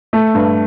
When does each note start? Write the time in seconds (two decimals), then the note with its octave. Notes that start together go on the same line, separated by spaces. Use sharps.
0.13 A3
0.34 G2